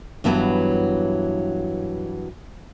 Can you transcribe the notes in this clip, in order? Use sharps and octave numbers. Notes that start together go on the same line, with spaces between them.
G2 E3 F#3 B3